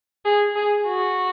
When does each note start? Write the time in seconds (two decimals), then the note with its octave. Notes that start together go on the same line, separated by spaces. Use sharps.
0.25 G#4
0.56 G#4
0.87 F#4